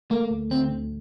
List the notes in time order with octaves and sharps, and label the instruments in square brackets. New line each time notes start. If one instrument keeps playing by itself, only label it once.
[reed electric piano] A3 [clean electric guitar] A#3
[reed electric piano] D2
[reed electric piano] D3 [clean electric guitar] C4
[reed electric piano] D2